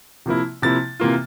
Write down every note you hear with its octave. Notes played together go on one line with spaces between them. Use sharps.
C3 F3 A#3 E4
C3 F3 A#3 E4 A6
C3 E3 A#3 F4